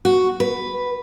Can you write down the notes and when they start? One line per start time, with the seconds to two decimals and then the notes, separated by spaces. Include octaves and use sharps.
0.05 F#4
0.40 B4